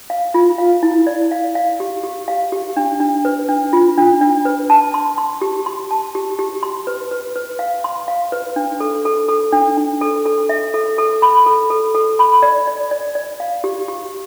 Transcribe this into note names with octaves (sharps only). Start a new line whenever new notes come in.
F5
F4
F5
E4
D5
F5
F5
G4
G4
F5
G4
D4
D4
B4
D4
F4
D4
D4
B4
A5
C6
C6
G4
C6
A5
G4
G4
C6
B4
B4
B4
F5
C6
F5
B4
D4
A4
A4
A4
D4
D4
A4
A4
E5
A4
A4
B5
A4
A4
A4
B5
D5
D5
D5
D5
F5
G4
G4